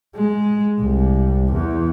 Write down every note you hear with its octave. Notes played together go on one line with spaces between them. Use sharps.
G#3
C2
E2